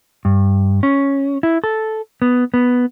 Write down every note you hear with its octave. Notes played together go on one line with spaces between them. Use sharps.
G2
C#4
E4
A4
B3
B3